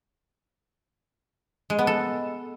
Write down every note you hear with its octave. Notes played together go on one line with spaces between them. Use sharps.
G#3
B3
A4